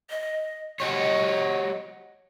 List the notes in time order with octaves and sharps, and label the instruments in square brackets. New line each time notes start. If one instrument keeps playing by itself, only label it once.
[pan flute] D#5
[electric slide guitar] F#4 G4 C#5 [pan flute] D#5